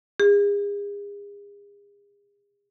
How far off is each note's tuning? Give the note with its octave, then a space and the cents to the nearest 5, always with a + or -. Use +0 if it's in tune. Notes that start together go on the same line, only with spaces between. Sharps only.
G#4 -40